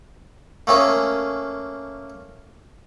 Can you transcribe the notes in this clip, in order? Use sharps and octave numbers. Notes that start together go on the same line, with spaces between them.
A3 A#3 C#4 G#4